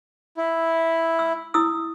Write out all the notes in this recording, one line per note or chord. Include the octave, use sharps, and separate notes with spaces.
E4
E6
E4 D#6 E6